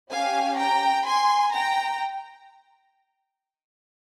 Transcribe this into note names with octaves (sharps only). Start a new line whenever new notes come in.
C#4 G4 F5 G#5
G5 A#5
G#5 C6
G5 A#5